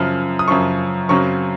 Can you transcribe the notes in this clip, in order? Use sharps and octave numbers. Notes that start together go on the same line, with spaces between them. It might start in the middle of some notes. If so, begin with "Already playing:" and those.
Already playing: F#2 C#3 F3 F6
D#6
F#2 C#3 F3 C#6
F#2 C#3 F#3 C4 C#6